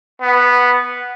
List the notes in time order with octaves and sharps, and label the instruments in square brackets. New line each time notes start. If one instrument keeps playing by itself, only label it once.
[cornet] B3